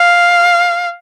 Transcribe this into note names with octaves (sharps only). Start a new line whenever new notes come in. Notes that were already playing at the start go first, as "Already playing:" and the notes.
Already playing: F5